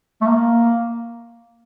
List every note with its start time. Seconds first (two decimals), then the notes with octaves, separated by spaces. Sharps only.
0.21 A3
0.26 A#3